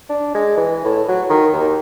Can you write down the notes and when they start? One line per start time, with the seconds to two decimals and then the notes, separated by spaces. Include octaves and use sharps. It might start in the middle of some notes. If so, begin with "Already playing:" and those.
0.09 D4
0.34 G#3
0.57 E3
0.85 A2
1.08 F#3
1.30 D#3
1.53 D#2